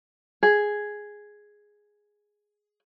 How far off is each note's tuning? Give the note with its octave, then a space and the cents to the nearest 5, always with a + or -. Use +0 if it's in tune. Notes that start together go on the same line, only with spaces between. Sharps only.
G#4 +0